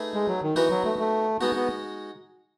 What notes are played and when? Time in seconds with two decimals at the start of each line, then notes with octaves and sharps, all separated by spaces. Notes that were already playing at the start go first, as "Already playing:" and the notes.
Already playing: A3 D#4 G#4 B4 E5
0.14 G#3
0.28 F#3
0.42 D#3
0.56 E3 B3 D#4 F#4 B4
0.70 F#3
0.85 A3
0.99 A3
1.41 G#3 B3 D#4 F#4
1.55 B3